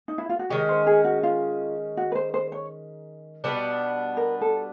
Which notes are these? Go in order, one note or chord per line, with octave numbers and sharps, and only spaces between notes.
D#4
E4
F4
F#4
D#3 G#3 C#4 G4
C5
G#4
F#4
F4
F#4
B4
C5
C5
C#5
B2 G3 B3 D4
A#4
A4